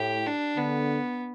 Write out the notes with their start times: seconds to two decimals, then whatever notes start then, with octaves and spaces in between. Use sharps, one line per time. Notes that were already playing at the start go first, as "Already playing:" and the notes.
Already playing: A2 G4
0.27 D4
0.57 D3 B3